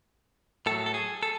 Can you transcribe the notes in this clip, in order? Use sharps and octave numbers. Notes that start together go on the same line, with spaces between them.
A2 F#3 A4
A4
G#4
A4